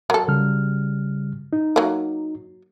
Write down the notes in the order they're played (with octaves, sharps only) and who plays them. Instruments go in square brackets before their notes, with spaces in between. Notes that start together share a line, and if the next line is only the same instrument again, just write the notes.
[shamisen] F#3 A4 [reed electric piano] A#4
[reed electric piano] C#3 G3 F6
D#4
[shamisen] F#3 A#3